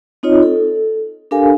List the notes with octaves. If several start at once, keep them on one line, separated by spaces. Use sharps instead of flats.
C4 D#4 F4 C#5 D#5
A4
D4 G4 A4 A#4 F5 G#5